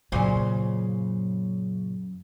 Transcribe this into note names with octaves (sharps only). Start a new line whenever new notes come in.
F#2 A#2 C#3 F#3 C5